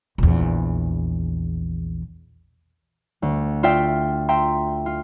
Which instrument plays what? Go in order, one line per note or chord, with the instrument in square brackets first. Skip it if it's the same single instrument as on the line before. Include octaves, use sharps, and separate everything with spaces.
[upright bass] A#1 E2
[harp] D2
F4 D5 E5 G5
E5 G5 A#5 C6
F4